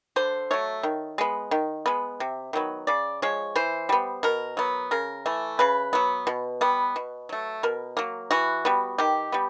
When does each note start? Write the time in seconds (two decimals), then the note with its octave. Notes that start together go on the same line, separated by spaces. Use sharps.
0.16 D3 C5
0.51 F#3 A3 C#5
0.83 D#3
1.18 G#3 B3
1.51 D#3
1.86 G#3 B3
2.20 C3
2.53 D#3 F#3 B3
2.87 C#3 D5
3.22 F3 G#3 C#5
3.56 E3 C5
3.89 G3 B3
4.23 B2 A#4
4.57 F#3 B3
4.91 C#3 A#4
5.26 E3 A3
5.59 C#3 B4
5.93 F#3 B3
6.27 B2
6.61 G3 B3
6.96 B2
7.29 F#3 A3
7.63 B2 A#4
7.97 F#3 A#3
8.31 E3 F#4
8.65 G3 B3
8.98 D#3 G4
9.32 G3 B3